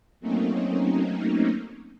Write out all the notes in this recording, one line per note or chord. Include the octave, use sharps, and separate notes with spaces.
F#3 A3 A#3 C4 C#4 D#4